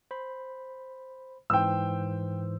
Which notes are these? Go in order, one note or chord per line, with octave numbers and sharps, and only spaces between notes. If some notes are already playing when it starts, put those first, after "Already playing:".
C5 B5
G#2 E3 C5 G5 E6